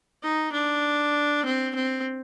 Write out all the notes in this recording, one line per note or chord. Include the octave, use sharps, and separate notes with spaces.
D#4
D4
C4
C4